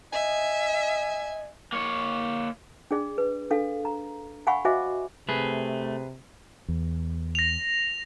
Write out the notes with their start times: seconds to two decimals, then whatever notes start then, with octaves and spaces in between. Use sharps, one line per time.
0.13 D#5 E5 G#5
1.72 A#3 C#5
2.91 D4 G#4 D5
3.18 B4
3.51 D4 A4 F5
3.85 A#5
4.47 F5 F#5 G#5 B5 C#6
4.65 F#4 C5 D#5 E5 G#5 D6
5.29 C3 A3 G#4 B4
6.68 E2
7.35 A#6 F7